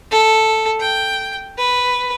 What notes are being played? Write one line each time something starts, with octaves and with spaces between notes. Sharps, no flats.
A4
G5
B4